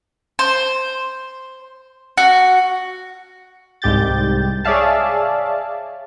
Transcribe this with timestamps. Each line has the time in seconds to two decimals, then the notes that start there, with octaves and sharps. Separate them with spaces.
0.39 C5
2.18 F#4
3.82 C2 G#2 G4 G6 A6
4.65 G#4 C#5 D5 E5 F5 A5